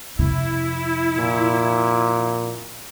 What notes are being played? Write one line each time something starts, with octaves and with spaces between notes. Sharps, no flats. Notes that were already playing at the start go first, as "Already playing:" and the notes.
F2 C3 E4
A#2